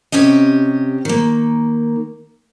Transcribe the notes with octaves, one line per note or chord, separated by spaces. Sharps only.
C3 C#4 G4 D#5
D#3 A#3